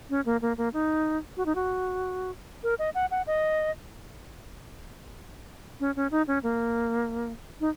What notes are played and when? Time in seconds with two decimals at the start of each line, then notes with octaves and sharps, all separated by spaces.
0.10 C#4
0.26 A#3
0.42 A#3
0.58 A#3
0.73 D#4
1.37 F#4
1.46 D#4
1.55 F#4
2.63 A#4
2.79 D#5
2.95 F#5
3.11 F#5
3.27 D#5
5.80 C#4
5.96 C#4
6.11 D#4
6.27 C#4
6.43 A#3
7.60 D#4